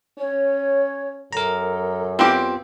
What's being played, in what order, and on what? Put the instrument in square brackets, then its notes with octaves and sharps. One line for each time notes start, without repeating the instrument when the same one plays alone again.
[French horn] C#4 [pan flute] C#5
[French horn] F#2 [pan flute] A4 [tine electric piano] A#4 A#5
[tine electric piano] B3 F4 [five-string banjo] C4 G4